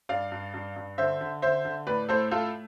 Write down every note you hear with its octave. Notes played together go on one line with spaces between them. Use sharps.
G2 D5 F5
G2
G2
G2
D3 C5 E5
D3
D3 C5 E5
D3
A2 B4 D5
A2 A4 C5
A3 F4 A4